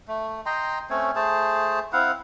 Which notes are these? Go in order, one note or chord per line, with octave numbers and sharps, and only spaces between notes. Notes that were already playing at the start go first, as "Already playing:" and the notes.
A3
D#5 G5 A#5 C6
A3 C4 C#4 C#5
A3 G#4 C5 A5
C4 E4 F5 F#5